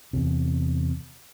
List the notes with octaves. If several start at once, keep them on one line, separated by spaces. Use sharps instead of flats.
E2 C3